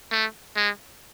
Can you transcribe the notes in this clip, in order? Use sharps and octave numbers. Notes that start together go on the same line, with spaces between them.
A3
G#3